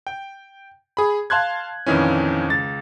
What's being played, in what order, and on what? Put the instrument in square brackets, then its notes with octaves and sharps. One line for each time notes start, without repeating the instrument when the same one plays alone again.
[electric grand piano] G5
G#4 B5
F5 A5 C6 F#6 G#6
F2 A#2 D#3 E3 C#4
C#2 A6